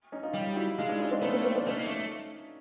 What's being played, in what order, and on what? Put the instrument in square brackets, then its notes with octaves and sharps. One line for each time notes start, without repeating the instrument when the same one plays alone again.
[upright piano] C#4 D#4
D#4 F4
[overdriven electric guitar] G3 [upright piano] F4 G4
[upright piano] E4 F#4
[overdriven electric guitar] G#3 [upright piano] D#4 F4
[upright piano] D4 E4
C#4 D#4
C4 D4
[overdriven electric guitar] A3 [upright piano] B3 C#4
[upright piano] A#3 C4
A#3 C4
C4 D4
[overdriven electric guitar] A3 [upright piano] C#4 D#4
[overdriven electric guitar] A#3
A3